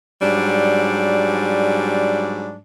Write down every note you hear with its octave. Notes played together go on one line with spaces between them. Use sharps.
G#2 F#3 G3 D4